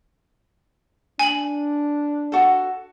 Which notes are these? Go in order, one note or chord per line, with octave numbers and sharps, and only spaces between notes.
D4 G#5 F#7
F#4 A4